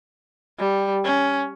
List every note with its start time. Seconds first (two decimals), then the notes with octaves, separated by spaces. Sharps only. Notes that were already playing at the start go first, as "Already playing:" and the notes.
0.59 G3
1.05 C#4